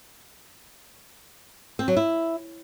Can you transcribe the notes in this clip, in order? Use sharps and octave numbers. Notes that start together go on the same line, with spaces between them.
C4
F#3
E4